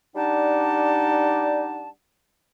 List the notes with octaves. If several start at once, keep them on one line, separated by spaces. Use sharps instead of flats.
G3 D4 D#4 D5 F#5 A5